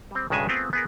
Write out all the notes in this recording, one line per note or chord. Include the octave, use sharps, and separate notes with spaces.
G3 C4
B1 G2 C#3 G#3 E5 G#5
A3 B3 C4 F4 G#4
B3 G#4 A#4